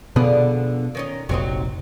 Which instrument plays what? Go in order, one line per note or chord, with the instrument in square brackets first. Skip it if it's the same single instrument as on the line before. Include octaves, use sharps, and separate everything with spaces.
[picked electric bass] B2 B3 [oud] D3 F3 G#4
[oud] D#3 C#4 D#4
[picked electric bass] F1 A#1 [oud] F#3 C4 D#4